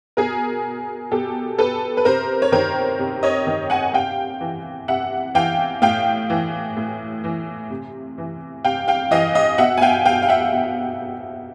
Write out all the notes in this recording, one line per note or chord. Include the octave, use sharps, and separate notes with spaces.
B2 G#4 A#4
B2 G4 A4
A4 B4
B4
C3 A#4 C5
C#5
D#3 A#4 C5
C3
C#5 D#5
D#3
F#5 G#5
C3 F5 G5
E3
C3 E5 F#5
E3 F5 G5
A2 F5 G5
E3
A2
E3
C3
E3
C3 F5 G5
F5 G5
E3 D#5 F5
D#5 F5
B2 E5 F#5
G#5
F5 G5
F5 G5
F5
E5 F#5
B2